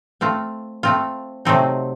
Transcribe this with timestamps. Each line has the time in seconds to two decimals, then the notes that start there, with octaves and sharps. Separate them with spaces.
0.21 A3 C4 F4
0.83 A3 C4 F4
1.45 C3 F#3 A3 C4 D#4